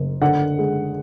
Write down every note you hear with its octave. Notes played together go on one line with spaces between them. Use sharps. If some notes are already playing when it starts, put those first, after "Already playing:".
Already playing: F#1
D3 F#5
G#3